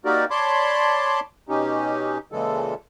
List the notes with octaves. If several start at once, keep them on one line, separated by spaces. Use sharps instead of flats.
A#3 D#4 F#4 G4 A#4 D5
C#5 D5 A5 B5 C6 D6
B2 C#4 D#4 G4
A#2 C#3 E3 G#3 A4